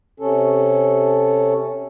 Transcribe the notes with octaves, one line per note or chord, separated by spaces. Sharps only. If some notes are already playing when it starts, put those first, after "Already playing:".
C3 C#4 A4